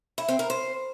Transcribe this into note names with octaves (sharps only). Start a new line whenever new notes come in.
E4
C4
A#4
C5